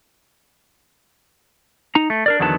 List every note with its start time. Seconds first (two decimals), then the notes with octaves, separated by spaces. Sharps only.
1.95 D#4 A#5
2.10 A3
2.26 D4 A#4 D5
2.39 E2 D3 D#3 F#3 B3 A5